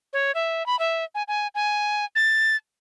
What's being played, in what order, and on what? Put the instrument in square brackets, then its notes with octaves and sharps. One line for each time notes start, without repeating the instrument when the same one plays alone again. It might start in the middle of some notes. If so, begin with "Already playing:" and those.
[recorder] C#5
E5
B5
E5
G#5
G#5
G#5
A6